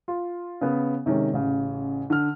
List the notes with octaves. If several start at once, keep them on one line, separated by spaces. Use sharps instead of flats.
F4
C#3 B3
C3 D#3 G#3 C#4
A1 C#3
D3 F6